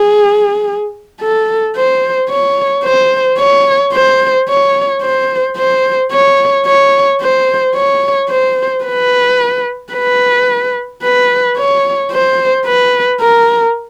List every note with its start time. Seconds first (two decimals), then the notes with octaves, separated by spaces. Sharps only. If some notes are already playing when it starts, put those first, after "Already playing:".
Already playing: G#4
1.21 A4
1.76 C5
2.30 C#5
2.84 C5
3.39 C#5
3.93 C5
4.49 C#5
5.02 C5
5.57 C5
6.12 C#5
6.66 C#5
7.21 C5
7.75 C#5
8.29 C5
8.85 B4
9.93 B4
11.03 B4
11.58 C#5
12.12 C5
12.66 B4
13.21 A#4